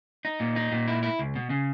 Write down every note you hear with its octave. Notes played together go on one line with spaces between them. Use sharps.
D#4
A#2
D#4
A#2
E4
E4
C#2
B2
C#3